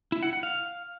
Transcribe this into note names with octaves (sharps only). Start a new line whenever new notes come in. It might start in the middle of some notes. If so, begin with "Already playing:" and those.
E4
F#5
F#5
F5